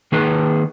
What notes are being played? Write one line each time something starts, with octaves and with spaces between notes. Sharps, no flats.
D#3 A#3 D#4 G#4 B4